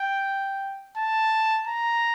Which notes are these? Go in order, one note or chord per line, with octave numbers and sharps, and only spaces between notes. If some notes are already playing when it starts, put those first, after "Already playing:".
Already playing: G5
A5
A#5